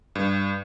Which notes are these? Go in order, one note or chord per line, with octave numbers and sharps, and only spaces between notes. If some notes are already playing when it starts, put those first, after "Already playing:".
G2